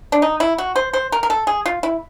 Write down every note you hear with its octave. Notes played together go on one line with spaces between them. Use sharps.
D4
D#4
E4
F#4
C5
C5
A#4
A#4
A4
G#4
F4
E4